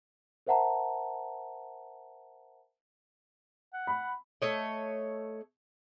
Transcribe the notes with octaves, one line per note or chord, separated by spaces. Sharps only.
A#4 C5 E5 F#5 A5 A#5
F#5
B5
A3 C#5 D#5